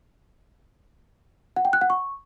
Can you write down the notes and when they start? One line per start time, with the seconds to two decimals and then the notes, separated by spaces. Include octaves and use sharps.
1.56 F#5
1.65 G5
1.73 F#6
1.81 F#5
1.90 C#6